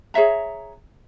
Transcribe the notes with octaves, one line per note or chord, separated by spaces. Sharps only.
G#4 C#5 E5 A#5